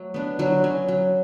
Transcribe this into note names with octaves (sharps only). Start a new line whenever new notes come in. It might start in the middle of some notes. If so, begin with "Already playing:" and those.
Already playing: F#3 A3
B3 D4
D3 F#3 F#4
F#3 C#4
F#3